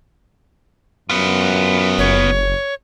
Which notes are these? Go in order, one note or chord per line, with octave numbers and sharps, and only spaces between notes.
F#2 B3 F4
F#1 C#5